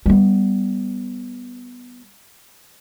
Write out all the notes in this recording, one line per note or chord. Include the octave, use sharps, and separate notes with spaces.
G3 B3